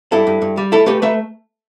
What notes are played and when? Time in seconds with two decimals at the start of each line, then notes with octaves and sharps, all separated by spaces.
0.12 G2 E4 A4
0.27 G2
0.42 G2
0.57 G3
0.72 A3 E4 A4
0.86 A3 G4 B4
1.02 A3 B4 E5